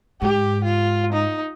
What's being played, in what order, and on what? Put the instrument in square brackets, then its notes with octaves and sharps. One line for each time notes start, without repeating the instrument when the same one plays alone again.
[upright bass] G#2 [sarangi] G4
[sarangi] F4
D#4